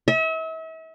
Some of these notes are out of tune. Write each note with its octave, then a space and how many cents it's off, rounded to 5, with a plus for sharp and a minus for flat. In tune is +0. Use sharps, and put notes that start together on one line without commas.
E5 -40